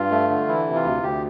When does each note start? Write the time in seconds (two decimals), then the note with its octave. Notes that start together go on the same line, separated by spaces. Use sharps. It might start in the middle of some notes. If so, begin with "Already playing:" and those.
Already playing: G2 F4
0.11 A3
0.29 D3
0.48 E3 E4
0.67 C3
0.75 F4
0.85 D2
1.03 D2 G4